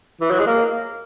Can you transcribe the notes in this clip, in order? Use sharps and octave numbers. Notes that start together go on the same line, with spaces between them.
E3
F#3
G#3
A#3